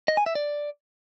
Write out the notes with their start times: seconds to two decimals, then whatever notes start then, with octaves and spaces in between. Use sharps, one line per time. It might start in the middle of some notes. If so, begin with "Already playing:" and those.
0.08 D#5
0.17 G#5
0.26 E5
0.35 D5